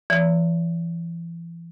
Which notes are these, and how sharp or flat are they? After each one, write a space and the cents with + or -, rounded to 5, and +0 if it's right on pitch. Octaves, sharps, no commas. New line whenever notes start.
E3 +35 D5 -45